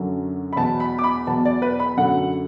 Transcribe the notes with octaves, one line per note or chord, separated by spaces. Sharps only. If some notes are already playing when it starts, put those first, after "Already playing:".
Already playing: F#2 D3 F#3
B5
E2 B2 F#3 A5
B5
D6
B5
E2 B2 F#3 A5
D5
B4
B5
F#2 D3 F#3 F#5